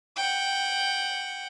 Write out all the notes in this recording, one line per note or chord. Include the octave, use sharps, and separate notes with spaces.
F#5 G5